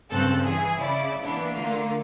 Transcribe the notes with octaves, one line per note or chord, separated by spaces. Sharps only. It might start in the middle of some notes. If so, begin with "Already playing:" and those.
G2 C#3 C4 A4 F#6
E3 G#4
C#3 E4 D5
E3 A#3 B3 D4
D3 A3 A#3 F4